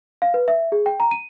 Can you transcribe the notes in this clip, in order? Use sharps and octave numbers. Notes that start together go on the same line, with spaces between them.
F5
B4
E5
G#4
G5
A#5
D#7